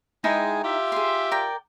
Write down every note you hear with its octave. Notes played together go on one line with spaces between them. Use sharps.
G#3 D#4 E4 G5 G#5
F4 G4 E5
G#4 C6
A#4 D5 G5